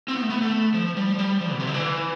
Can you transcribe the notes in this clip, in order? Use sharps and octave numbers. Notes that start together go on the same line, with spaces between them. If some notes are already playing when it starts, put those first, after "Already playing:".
C4
B3
A3
B3
A3
F3
G3
F3
G3
F3
B2
C3
D3
E3